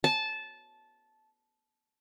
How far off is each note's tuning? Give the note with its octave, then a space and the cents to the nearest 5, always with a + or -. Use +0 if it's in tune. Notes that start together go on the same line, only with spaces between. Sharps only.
A5 -15